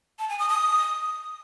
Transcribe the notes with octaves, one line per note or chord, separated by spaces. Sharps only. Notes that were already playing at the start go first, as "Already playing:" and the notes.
A5
G#5
D#6
D#6